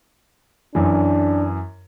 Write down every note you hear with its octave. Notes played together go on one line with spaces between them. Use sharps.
F#2 E3 D4